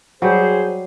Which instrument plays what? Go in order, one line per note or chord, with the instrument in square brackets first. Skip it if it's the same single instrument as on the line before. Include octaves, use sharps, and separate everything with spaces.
[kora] F#3 G3 [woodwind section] G#4 C5